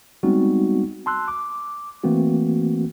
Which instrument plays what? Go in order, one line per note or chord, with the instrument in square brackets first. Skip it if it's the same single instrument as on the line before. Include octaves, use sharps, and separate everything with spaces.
[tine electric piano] G3 G#3 B3 C4 D#4 F#4
A5 C6 E6 F#6
D6
E3 A3 A#3 C4 F#4